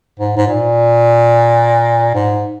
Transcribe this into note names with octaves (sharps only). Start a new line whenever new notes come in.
G#2
G#2
A#2
G#2